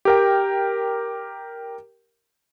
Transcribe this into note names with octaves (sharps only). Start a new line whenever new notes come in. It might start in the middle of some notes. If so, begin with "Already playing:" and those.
G4 A#4 G5